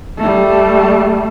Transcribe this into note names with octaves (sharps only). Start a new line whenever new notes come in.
G3 A3